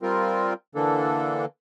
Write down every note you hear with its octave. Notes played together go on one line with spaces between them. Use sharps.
G3 C4 F4 A#4
D3 E3 A#3 D4 A4